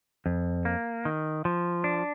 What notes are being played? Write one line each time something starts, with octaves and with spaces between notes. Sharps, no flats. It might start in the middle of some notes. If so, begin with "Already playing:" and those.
F2
A#3
D#3
F3
D4